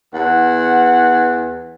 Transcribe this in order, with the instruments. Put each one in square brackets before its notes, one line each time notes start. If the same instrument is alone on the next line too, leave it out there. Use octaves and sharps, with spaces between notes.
[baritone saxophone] E2 [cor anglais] F#5